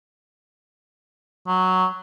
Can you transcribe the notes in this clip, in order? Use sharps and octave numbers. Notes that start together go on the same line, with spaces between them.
F#3